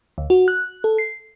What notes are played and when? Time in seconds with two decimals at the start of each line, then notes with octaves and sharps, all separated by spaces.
0.18 D2
0.30 F#4
0.48 F#6
0.84 A4
0.98 C7